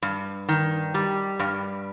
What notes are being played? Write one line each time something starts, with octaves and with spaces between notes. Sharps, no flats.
G2
D#3
G3
G2